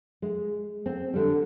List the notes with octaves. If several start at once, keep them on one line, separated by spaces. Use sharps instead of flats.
G#3
C4
D3 G3